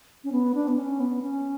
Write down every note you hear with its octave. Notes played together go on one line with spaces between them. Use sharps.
C#4
B3
D4
B3
C#4
B3
C#4